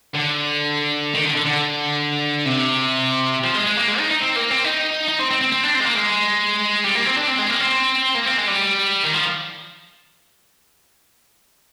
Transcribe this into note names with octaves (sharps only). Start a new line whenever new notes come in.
D3
D#3
D3
D3
D3
C3
F3
G#3
G#3
A#3
G#3
D#4
D#4
C4
A#3
C4
D#4
D#4
C4
C4
C4
C4
D4
C4
G#3
A#3
G#3
G3
A#3
C4
D4
C4
G#3
A#3
C4
A#3
C4
G#3
G3
D#3
F3